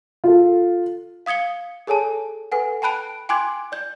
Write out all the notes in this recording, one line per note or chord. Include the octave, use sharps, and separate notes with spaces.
F4 A4
F5 D#6 G#6 C#7 G7
G#4 A4 C#5 G#5 A5
A4 B4 F#5 G#5
G5 A5 B5 F#6 D7
G5 G#5 C6 D6 F#6 G#6
D5 G6